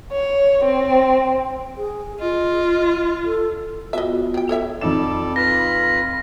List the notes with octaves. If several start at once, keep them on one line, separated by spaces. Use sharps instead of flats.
C#5
C4
G#4
F4 D#5
A4
B3 F4 F#4 D#5 E5
C4 G5
A4 C#5 E5
F2 D#4 A4 D5 E7
F4 B4 A#6